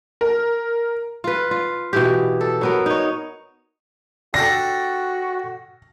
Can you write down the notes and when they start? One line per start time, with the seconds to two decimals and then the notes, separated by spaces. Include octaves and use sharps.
0.21 A#4
1.24 F4 B4
1.51 F4
1.93 B2 E3 G4
2.41 A4
2.61 F#3 B3 A#4
2.86 D#4 C#5
4.34 D4 F#4 G4 A4 A#6